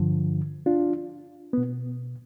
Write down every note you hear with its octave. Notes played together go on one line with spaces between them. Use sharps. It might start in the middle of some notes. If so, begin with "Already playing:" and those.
Already playing: G2 D3 F3
D4 F4
B3
B2